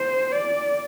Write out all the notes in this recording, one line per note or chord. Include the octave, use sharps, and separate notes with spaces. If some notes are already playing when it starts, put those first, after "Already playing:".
Already playing: C5
D5